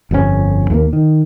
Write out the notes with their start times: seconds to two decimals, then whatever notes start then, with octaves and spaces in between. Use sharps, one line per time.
0.11 G1 F2 G#2 C#4
0.70 D#2 A3 A#3
0.93 D#3